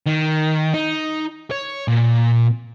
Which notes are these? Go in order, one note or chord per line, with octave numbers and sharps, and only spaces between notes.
D#3
D#4
C#5
A#2